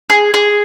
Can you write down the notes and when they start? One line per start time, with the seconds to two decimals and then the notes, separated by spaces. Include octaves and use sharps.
0.10 G#4
0.34 G#4